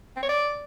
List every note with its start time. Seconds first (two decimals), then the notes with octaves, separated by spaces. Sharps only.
0.16 C4
0.23 C#5
0.29 D5